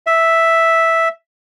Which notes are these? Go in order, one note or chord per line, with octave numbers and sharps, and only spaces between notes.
E5